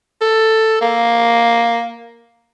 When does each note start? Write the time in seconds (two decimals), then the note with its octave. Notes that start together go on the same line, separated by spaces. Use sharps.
0.21 A4
0.81 A#3